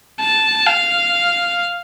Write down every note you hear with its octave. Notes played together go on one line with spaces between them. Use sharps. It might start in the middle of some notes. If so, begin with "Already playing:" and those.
A5
F5